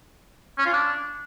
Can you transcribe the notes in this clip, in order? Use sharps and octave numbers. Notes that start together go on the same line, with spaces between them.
C#4
F4
D4